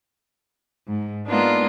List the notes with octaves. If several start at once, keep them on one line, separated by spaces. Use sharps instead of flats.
G#2
G#3 A#3 B3 D4 D#4 F4